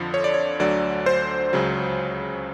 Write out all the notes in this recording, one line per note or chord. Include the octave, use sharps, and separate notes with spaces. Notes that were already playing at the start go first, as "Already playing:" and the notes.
Already playing: F2 D3 F3
C#5
D5
C#5
D2 D3 F#3 D5
C5
C#2 C#3 F#3